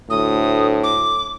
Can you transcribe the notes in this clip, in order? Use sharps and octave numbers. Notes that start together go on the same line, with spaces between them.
D2 A2 D#6
D6